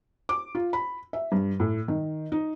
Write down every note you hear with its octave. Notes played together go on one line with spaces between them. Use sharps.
D6
F4
B5
E5
G2
A2
D#3
D#4